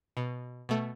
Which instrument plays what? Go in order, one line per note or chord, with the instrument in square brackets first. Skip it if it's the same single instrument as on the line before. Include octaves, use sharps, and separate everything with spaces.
[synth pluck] B2
B2 A3